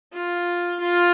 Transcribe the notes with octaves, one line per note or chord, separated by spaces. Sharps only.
F4
F4